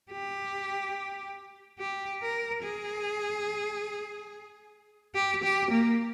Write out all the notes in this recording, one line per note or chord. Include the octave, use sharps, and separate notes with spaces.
G4
G4
A#4
G#4
G4
G4
A#3